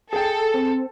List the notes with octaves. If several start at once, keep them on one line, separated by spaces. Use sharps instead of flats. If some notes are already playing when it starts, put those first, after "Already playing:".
G#4 A4 G5
C4